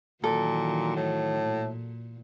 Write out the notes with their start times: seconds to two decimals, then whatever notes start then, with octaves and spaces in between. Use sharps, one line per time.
0.24 A#2 D#3 E3 F#3 A4
0.96 A2
1.44 A#2